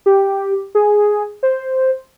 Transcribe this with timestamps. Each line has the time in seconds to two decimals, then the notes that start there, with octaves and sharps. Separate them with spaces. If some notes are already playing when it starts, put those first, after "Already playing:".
0.06 G4
0.75 G#4
1.43 C5